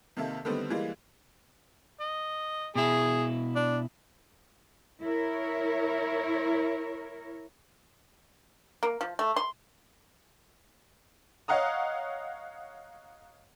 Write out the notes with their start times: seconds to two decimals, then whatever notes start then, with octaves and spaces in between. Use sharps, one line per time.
0.17 C3 D#3 A#3 A4 E5
0.45 D3 D#3 G3 A3 B3 C4
0.70 E3 G3 G#3 A#3
2.00 D#5
2.75 B2 E4 G#4
3.55 D4
5.01 E4 A#4 C#5
8.83 A#3
9.01 F3
9.19 A3
9.36 C6
11.48 C#5 D#5 F5 F#5 A#5 D#6